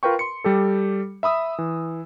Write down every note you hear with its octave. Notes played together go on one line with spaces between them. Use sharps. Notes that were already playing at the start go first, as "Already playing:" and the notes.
F4 A#4 B4 G5 C#6
C6 C#7
G3 G4 A4
E5 B5 D#6 E6
E3